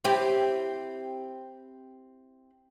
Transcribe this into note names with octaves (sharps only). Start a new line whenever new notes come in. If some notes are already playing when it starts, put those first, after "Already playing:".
C4 E4 G4